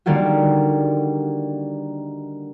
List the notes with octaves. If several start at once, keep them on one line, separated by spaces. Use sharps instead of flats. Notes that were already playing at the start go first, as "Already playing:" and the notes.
D3 D#3 G3 A#3 F4 F#4